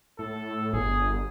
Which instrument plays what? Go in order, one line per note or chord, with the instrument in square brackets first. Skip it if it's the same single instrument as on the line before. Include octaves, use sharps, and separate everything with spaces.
[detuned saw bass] A2 [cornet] A4
[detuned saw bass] G1 [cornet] G#4